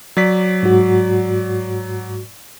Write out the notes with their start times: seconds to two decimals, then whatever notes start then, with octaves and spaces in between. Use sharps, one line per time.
0.17 F#3 D5 B6
0.63 G#2 F#4